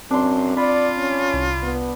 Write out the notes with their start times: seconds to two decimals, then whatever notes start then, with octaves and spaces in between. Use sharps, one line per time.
0.11 F#2 C4 D4 C6
0.57 F4 D5 B5
0.98 C#4
1.33 C2
1.62 B3